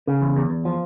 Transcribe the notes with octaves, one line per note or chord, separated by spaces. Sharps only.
C#3
E2
E2
E2
F3